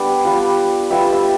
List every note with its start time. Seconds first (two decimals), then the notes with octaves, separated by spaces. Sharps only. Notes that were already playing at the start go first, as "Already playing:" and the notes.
Already playing: G3 B3 D4 D5
0.25 G3 B3 F4
0.90 G3 B3 F4 E5
1.13 E5